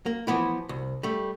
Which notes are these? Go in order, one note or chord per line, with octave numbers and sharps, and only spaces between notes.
A#3
E3 F3 B3 E4
C2
G3 A3